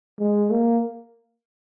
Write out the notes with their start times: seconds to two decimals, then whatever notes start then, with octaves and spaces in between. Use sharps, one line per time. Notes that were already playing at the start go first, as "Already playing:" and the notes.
0.19 G#3
0.51 A#3